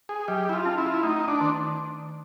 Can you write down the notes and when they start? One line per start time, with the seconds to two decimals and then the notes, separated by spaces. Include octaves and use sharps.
0.09 G#4
0.28 F#3 G4
0.49 E4
0.53 F4
0.65 C#4
0.78 E4
0.86 F4
0.94 E4
1.03 A3 D#4
1.28 D4
1.41 D#3